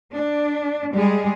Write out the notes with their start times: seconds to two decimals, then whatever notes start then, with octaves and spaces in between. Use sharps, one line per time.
0.13 D4
0.92 G3 G#3 G#4